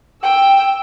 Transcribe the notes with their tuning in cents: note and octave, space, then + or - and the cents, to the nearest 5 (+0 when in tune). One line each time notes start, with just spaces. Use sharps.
G5 +5 E6 +0